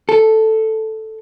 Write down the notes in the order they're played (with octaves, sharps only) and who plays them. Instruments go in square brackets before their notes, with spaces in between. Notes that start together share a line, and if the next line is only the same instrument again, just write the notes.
[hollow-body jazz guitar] A4